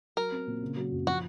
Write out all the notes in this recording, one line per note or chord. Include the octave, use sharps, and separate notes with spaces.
F#3 A#4
C4
A#2
C#3
F#3
F#2
F3 F#4